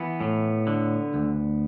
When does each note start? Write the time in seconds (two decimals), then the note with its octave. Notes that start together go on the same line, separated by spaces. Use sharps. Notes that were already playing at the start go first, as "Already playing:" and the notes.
Already playing: E3 B3
0.21 A2
0.67 D3
1.14 D2